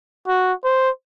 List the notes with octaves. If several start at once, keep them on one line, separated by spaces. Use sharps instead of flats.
F#4
C5